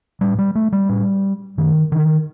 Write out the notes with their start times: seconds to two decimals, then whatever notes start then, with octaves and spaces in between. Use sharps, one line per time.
0.21 A2 G3
0.38 G3
0.55 A3
0.72 G3
0.89 A2
1.58 F#2 D#3
1.92 D3 D#3